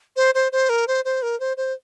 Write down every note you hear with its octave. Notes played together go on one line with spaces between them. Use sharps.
C5
C5
C5
A#4
C5
C5
A#4
C5
C5